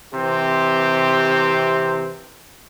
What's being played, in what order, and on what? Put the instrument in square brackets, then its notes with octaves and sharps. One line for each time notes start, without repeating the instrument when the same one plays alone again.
[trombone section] C3 E3 C4 G4